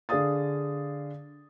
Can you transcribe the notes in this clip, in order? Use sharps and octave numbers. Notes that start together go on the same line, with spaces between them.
D3 G#4 D5 F5 D#6 A6